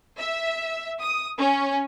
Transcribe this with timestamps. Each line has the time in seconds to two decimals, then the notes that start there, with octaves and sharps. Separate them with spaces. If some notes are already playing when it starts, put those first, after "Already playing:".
0.19 E5
1.00 D#6
1.39 C#4